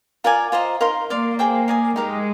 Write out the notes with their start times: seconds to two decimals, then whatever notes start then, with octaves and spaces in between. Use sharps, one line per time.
0.24 F4 A#4 D5 G#5
0.52 F4 C5 D#5 A#5
0.81 D#4 A#4 F5 C6
1.10 A#3 D5 F5 C6
1.39 G#4 C5 G5 D6
1.68 A#4 D5 G#5 D#6
1.96 G#3 D#4 G4 A#4